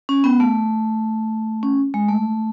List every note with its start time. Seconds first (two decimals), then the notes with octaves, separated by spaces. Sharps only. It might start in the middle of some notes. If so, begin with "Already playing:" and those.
0.09 C#4
0.24 B3
0.40 A3
1.63 C#4
1.94 G#3
2.09 A3